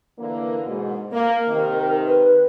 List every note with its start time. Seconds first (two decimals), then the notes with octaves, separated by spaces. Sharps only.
0.19 D3 E3 A#3
0.67 G#2 B2
1.11 A#3 A#4
1.48 C3 D#3
2.06 B4